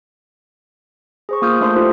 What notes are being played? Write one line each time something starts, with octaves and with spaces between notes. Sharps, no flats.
G#4 C5 C#6
A#3 F4 D#6 F6 G6
A3 D4 C5 C6 D#6
D4 E4 F4 G4 A4 C5